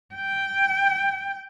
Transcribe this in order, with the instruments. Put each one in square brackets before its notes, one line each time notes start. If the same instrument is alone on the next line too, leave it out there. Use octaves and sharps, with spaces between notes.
[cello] G5